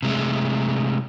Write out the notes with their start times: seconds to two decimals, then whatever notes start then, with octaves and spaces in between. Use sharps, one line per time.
0.03 C3 G#3 A3